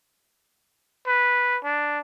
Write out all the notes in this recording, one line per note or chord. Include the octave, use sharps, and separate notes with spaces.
B4
D4